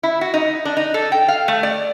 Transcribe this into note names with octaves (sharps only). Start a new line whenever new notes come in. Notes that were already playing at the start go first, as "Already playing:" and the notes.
E4
F#4
D#4
D4
D#4
A4
G5
F5
A3
D5